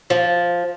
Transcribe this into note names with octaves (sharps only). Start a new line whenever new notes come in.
F3